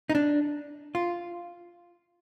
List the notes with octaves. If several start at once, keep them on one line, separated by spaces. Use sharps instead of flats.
D#4
D4
F4